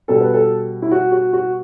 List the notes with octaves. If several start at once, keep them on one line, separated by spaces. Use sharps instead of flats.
B2 G3 A4
B4
A4
E4
F#4
F#4
F#4